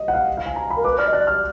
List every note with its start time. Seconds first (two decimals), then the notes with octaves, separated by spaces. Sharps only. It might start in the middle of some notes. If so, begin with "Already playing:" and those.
Already playing: D#5
0.08 F#5
0.13 F5
0.37 F5
0.46 G#5
0.56 A#5
0.70 B5
0.77 A#4
0.84 B4 D6
0.98 D5 F6
1.08 D#5
1.13 D5 F#6
1.27 F6